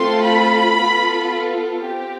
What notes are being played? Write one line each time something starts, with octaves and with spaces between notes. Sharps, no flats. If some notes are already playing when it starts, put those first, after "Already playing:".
Already playing: A3 C4 F4 A4 C6
B5
B3 F4 A4
C4 G4